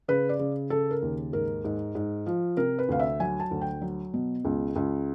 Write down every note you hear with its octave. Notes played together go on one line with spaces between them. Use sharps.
C#3 B4
D5
C#3
C#3 A4
A#4
D#2
G#2 A#4
G#2
G#2
F3
C3 A#4
B4
D2 F5
E5
F#3 G#5
A5
D2
G5
F#3
B2
C#2
C#2